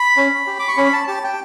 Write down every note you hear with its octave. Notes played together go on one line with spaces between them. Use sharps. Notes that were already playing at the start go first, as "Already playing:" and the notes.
Already playing: B5
C#4
G4
D6
C#6
C#4 B5
A5
G4 A5
G5